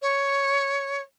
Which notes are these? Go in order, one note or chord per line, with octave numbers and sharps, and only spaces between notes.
C#5